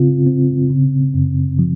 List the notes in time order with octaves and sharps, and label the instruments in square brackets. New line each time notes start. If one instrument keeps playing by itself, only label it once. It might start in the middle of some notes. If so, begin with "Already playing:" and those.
Already playing: [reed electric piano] C#3 C4 F4
C4
C#3
F#2
F3